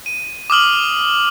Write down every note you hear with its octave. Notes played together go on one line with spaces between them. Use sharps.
D#7
D6 D#6 F6 F#7